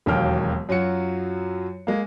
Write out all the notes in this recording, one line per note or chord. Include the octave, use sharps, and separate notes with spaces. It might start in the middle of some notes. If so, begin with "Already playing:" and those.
E1 D#2 F#3 A#3 G5 F6
F#2 F#3 F4 F#4 C#7
G#3 A#3